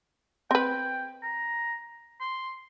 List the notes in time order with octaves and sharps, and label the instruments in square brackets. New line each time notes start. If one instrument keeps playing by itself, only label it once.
[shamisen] C4 B4 [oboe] G5
[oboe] A#5
C6